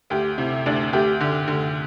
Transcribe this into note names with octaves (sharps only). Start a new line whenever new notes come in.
D2 G4
C3 E4
D2 D4
D2 G4
D3
D3